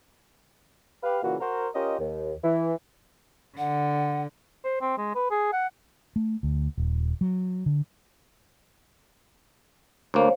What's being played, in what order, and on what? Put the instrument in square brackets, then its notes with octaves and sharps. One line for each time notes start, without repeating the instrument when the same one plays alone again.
[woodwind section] G4 B4 F5
A#2 C#3 E3 A#3 F#4
F#4 A#4 C5
C#4 F4 G4 A#4 D#5
D#2
E3
[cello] D3 [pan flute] F#5
[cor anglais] C5
C4
G#3
B4
G#4
F#5
[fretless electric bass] A3
D2
D#1
F#3
D3
[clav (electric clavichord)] D2 A#3 [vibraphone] C5 C#5 F5